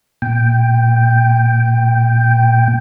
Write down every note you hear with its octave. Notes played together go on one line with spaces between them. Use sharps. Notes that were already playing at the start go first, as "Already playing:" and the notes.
A#2 G5